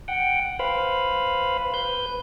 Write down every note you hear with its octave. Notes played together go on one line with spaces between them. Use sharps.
F#5 G5
B4 C5 F5 B5
B4 G6